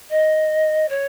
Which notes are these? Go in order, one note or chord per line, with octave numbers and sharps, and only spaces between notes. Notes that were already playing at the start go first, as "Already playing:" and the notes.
D#5
C#5